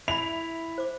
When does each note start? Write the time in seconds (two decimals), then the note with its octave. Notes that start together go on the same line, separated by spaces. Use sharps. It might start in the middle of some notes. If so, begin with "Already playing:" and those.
0.08 E4 E5 B5 F7
0.78 C5 D6